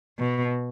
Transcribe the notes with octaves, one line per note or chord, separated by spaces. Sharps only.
B2